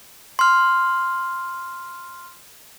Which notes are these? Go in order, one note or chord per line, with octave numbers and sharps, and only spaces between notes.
C6 F6